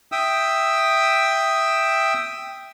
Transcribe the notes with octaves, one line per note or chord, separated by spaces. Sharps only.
E5 G5 D#6 E6